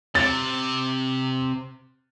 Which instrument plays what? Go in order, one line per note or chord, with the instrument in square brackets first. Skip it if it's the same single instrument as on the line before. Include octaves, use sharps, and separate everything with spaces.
[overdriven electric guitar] C3 [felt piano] A6